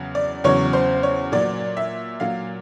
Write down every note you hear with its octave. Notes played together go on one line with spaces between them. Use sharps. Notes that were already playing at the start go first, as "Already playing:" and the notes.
Already playing: E2 C#3 F#3
D5
E2 C#3 F#3 C#5
C5
C#5
A#2 F#3 D5
E5
A#2 F#3 F5